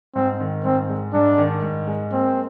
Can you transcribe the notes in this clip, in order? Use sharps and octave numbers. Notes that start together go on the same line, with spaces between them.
G#2 C4
D#3
G#2 C4
G#3
G#2 D4
D#3
G#2
G#3
A#3 C4